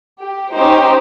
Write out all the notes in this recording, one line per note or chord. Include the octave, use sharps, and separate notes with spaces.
G4
C#4 D#4 G4 C5